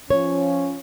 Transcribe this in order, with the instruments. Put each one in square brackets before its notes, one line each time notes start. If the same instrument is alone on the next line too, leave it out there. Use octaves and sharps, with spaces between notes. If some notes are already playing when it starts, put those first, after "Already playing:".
[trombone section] F3 C#4 F4 [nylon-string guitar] C#5